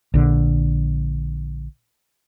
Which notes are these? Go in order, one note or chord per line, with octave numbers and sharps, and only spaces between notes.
A#1 D3